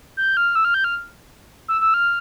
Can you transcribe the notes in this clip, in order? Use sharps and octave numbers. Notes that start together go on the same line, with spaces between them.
G6
F6
E6
F6
G6
F6
E6
E6
F6